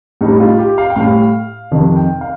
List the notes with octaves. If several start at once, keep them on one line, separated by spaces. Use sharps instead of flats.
A2 G3 D#4
F4
G4
F5
G5
A2 G3 F5
F2 C3 D#3
G5
F5